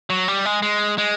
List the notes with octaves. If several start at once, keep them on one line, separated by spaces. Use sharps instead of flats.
F#3
G3
G#3
G#3
G#3